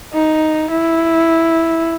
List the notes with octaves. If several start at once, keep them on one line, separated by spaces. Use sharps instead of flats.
D#4
E4